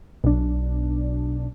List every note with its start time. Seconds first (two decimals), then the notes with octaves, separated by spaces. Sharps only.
0.24 B1 D4